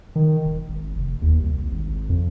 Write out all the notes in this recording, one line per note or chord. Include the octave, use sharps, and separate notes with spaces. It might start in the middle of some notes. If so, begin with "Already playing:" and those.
D#3
D#1
G#1
F1
D#2
C2
G#1
F2